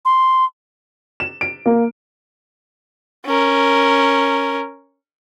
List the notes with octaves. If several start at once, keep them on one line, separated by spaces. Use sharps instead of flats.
C6
E7
D7
A#3
C#4 A#4